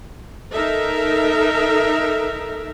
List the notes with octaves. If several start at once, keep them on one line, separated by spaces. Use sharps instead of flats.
D#4 A4 A#4 E5